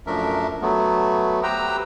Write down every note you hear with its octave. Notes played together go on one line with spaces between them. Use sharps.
F#2 F3 A3 D4 A#4 E5
F#3 A3 B3
G4 B4 C5 G5 A#5 E6